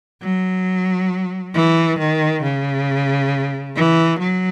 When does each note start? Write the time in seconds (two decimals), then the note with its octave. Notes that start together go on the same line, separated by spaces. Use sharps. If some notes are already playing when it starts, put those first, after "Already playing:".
0.22 F#3
1.55 E3
1.99 D#3
2.43 C#3
3.76 E3
4.19 F#3